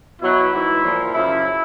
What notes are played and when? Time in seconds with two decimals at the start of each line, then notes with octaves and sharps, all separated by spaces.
0.21 B2 F#3 E4
0.52 G#2 E3
0.83 A#2 F3
1.13 F#2 C#3 F3 E4